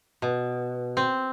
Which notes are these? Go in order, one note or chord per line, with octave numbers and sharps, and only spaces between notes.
B2
C4